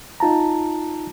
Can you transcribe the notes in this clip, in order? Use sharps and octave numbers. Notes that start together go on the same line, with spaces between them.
D#4 F4 A5 A#5